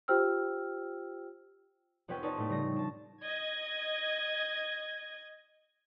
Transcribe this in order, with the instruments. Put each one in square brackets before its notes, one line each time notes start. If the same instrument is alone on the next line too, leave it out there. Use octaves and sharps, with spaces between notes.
[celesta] F4 G4 C5 G5 E6 F6
[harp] F1 F2 B3 C#4 B4 G5
C#4 D#4 B4 D5 A5
A2 A3
C#3 G3 A#6
D4 A5
[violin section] D#5 G#6